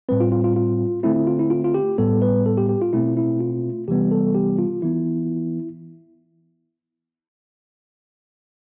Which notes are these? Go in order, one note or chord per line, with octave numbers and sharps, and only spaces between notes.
A2 G3 C4 B4
F4
F4
F4
F4
D3 A3 C4 E4
E4
F4
E4
F4
F4
G4
A2 G3 B3 A4
B4
A4
G4
G4
F4
B2 A3 C4 E4
E4
F4
C3 E3 G3 B3 G4
A4
G4
F4
E3 B3 E4